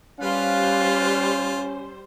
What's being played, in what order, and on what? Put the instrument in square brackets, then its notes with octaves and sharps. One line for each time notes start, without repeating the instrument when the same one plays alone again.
[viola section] G3 C5 [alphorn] C#4 [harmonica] F4 [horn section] B4 F5